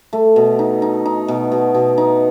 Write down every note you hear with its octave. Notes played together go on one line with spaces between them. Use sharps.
A3
B2
D#4
D#4
D#4
B2
B2
B2
D#4